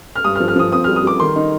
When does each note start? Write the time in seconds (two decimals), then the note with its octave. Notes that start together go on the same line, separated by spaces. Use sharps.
0.16 F6
0.24 G2 D#6
0.35 F6
0.40 F3
0.48 F6
0.56 F3 D#6
0.72 C4 D#6
0.84 G3 F6
0.96 D#6
1.03 G3 D6
1.20 D#3 C6
1.36 D#4